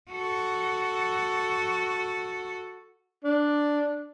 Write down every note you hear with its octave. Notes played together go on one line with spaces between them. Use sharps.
F#4 A4
D4